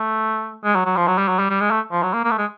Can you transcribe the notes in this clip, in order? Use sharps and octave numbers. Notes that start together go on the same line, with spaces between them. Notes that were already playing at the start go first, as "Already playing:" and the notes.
Already playing: A3
G#3
F#3
F#3
F3
F#3
G3
F#3
G3
G3
G#3
A3
F3
F#3
A#3
A#3
A3
G#3